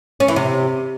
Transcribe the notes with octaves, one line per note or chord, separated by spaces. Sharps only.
C#4
E3
C3